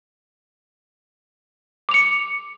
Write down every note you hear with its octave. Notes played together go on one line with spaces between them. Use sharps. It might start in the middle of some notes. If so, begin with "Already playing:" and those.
D6 C#7 F7